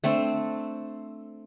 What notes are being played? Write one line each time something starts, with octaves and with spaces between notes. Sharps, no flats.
A3 C4 D4 C5